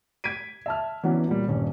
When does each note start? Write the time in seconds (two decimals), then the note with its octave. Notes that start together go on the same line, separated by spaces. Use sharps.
0.24 G#6 B6 D7 D#7
0.66 E5 A5 F6
1.03 E3 F#3 B3 C#4 D4
1.28 A#2 G3
1.48 D#1 G2 C#4